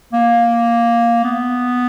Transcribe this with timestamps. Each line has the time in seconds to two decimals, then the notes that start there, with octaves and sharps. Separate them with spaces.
0.13 A#3
1.24 B3